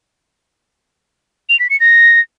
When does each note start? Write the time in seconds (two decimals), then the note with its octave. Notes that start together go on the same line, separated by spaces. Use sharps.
1.49 F7
1.59 B6
1.70 C#7
1.80 A#6